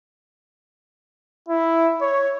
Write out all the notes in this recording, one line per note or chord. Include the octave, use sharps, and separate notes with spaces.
E4
C#5